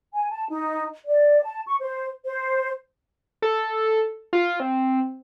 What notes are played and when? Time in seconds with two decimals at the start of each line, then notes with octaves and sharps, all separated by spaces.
0.13 G#5
0.31 A5
0.49 D#4
1.06 D5
1.43 A5
1.67 C#6
1.81 C5
2.24 C5
3.42 A4
4.33 F4
4.60 C4